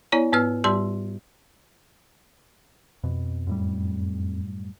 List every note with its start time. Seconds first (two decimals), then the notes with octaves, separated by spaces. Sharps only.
0.12 B3 E4 C#5 D5 A#5
0.33 G#2 B3 B4 E6 F6
0.64 G#2 G3 G4 D5 C6 E6
3.04 F2 B2
3.47 F#2 A2 G3